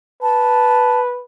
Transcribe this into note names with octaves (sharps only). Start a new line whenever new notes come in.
B4 A5